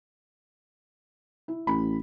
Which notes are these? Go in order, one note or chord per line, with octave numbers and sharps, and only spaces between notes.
E4
A1 B5